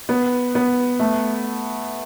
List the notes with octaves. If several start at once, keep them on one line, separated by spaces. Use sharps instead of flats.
B3
B3
A3